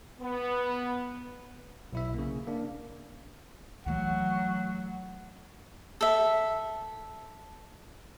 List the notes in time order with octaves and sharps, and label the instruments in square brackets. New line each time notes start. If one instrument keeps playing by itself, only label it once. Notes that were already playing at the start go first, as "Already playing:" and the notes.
[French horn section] B3
[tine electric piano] B1 E4 E5
C#3 A#3
A#3 D4
[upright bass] E3 A3 [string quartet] F#3 [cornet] F#5
[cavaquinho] A4 E5